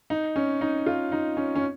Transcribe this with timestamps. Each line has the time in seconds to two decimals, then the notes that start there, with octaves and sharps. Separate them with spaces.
0.10 D#4
0.36 C#4
0.61 D#4
0.86 F4
1.12 D#4
1.37 C#4
1.55 C#4